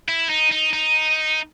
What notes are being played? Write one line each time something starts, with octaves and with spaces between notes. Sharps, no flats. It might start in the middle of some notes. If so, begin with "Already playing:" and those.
E4
D#4
D#4
D#4